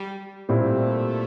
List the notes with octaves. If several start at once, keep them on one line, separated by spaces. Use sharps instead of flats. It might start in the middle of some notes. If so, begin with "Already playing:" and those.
Already playing: G3
A#2 G3 A3 C4 E4